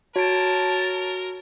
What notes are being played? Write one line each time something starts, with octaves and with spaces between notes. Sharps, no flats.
F#4 A#4 C#5 A5 D7